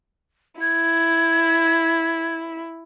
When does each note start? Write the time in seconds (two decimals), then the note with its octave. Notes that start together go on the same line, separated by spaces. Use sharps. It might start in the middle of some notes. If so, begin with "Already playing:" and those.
0.61 E4 G#6